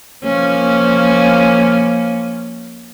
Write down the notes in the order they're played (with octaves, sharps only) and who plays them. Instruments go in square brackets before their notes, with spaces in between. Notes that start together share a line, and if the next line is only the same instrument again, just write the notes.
[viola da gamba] F3 A#3 C#4